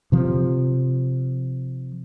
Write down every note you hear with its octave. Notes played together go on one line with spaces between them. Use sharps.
C3 F3